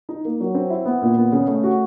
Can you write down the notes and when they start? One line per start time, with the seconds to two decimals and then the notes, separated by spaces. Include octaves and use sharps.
0.09 D#4
0.25 A#3
0.40 F#3
0.55 C4
0.70 E4
0.85 B3
1.02 A#2
1.17 B3
1.32 C#3
1.47 A3
1.63 F#4